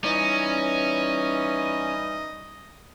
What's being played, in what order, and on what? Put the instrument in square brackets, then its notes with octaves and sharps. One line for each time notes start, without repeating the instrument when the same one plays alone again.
[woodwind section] E3 G3 D#4 [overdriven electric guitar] C#4 [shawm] D#5